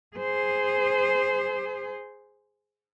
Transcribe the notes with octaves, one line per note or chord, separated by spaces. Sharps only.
G#4 C5